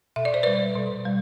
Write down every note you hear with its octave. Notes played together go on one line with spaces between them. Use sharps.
B2 E5
D5
C5
G3 B4 D5
B2
G3